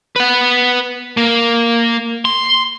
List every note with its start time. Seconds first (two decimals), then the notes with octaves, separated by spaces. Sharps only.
0.16 B4 F#5
1.17 A#3
2.25 C6